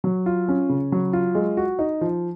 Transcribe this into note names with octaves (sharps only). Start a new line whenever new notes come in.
F#3
F4
C#4
C#3
F#3
F4
G#3
F#4
D#4
F3